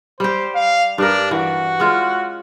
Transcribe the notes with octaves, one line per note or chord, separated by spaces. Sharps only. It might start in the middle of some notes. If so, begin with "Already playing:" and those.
G3 G4 C5
F5
G2 D4 A#4
E3 F#4
G#3 C#4 F4